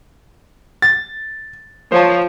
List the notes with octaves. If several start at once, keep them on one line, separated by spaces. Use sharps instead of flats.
A6
F3 C5 C#5 A5